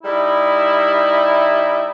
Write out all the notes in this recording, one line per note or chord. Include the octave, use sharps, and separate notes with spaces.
G3 D#4 E4